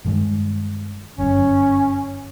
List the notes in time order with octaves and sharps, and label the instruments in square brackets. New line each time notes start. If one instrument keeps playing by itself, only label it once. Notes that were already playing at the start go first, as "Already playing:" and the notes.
[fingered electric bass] G2 D#3 G#3
[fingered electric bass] G1 F#2 [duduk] C#4